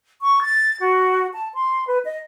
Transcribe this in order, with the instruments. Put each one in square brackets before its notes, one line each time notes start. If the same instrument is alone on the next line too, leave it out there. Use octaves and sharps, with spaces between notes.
[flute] C#6
A6
F#4
A5
C6
B4
D#5